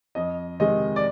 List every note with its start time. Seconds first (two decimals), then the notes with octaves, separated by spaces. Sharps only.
0.15 F2 D#5
0.60 C3 D#3 G#3 D#5
0.96 D5